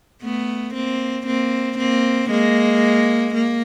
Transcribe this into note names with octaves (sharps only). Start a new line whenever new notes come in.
A3 B3
A#3 C4
A#3 C4
A#3 C4
G#3 A#3
A#3